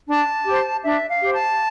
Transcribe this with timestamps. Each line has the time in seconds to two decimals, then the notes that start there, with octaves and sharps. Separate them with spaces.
0.09 D4 A5
0.46 G4 C5
0.84 D4 E5
1.09 F5
1.21 G4 C5
1.34 A5